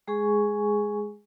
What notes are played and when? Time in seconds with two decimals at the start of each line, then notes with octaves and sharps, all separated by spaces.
0.07 G#3 G#4 G#5 C#6